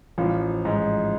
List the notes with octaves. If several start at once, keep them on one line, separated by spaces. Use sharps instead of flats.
A1 F3
G#2